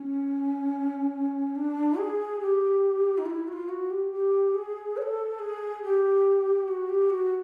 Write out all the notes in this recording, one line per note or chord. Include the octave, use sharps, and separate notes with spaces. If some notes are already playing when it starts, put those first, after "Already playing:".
Already playing: C#4
D4
G#4
G4
D#4
F4
E4
F#4
F4
F#4
G4
G4
G#4
C#5
A4
G#4
G4
F#4
G4
F#4